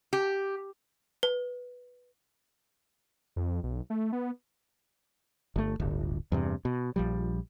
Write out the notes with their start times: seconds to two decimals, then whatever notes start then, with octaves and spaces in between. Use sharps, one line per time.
0.13 G4
1.23 B4
3.36 F2
3.63 B1
3.90 A3
4.13 B3
5.56 G1 A3
5.80 D1 G1
6.32 E2 G2 C3
6.65 B2
6.96 A#1 F3 G3